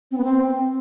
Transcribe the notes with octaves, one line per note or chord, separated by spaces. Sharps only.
C4
B3
C4